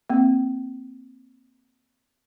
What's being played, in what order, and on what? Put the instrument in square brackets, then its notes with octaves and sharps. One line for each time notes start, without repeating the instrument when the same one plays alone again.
[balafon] A#3 C4